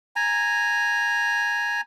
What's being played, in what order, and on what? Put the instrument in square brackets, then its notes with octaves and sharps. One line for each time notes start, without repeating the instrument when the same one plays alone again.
[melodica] G#5 A#5